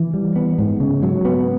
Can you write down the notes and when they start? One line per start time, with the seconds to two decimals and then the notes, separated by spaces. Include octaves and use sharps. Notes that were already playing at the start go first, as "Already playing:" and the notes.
Already playing: E3
0.14 G3
0.36 B3
0.58 G#2
0.80 C#3
1.03 F#3
1.25 B3